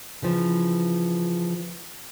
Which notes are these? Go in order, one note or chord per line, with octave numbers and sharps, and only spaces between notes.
C#3 E3 F3